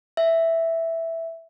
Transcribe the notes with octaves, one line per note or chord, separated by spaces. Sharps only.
E5